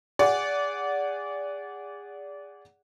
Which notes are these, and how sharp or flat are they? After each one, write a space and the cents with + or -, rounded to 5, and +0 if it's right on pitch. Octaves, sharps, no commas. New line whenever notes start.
G#4 -25 D5 -25 F#5 +0